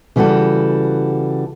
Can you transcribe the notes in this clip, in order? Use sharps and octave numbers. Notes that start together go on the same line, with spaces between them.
C#3 E3 G3 F4 F#4 A4